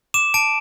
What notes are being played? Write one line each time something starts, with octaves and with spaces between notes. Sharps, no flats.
D6 E7
A5 D7